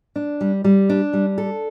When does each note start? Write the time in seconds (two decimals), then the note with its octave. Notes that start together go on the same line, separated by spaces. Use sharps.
0.16 D4
0.41 G3
0.64 G3
0.89 D4
1.13 G3
1.38 A4